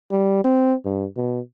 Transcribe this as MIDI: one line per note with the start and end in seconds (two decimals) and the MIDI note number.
0.11 0.42 55
0.44 0.74 60
0.85 1.05 43
1.17 1.40 47